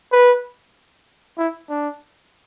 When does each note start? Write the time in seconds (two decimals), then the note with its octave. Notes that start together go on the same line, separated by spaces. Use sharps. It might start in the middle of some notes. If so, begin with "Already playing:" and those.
0.12 B4
1.38 E4
1.70 D4